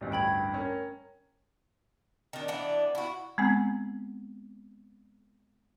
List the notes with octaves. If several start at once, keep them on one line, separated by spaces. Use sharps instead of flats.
A1 D2 G2
G5 B5 G#6
C#4 A#4
D#3 D4
E3 B3 D4
E4 F#4
G#3 B3 C4 G#5